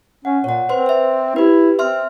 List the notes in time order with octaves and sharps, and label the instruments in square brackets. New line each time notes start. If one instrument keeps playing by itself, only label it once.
[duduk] C#4 [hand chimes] F#5
[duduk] A#2 [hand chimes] C#5 F#5
[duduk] C4 [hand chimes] B4 C5 C6
[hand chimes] C5 E5
[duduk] E4 [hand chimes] G4 B4
[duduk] C4 [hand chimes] E5 C6 F6